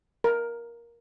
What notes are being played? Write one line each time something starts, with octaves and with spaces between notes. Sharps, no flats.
A#4